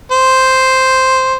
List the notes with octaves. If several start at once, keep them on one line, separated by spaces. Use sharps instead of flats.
C5